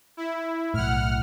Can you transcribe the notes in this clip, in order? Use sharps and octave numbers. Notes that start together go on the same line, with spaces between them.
E4
B1 A2 F#5 F6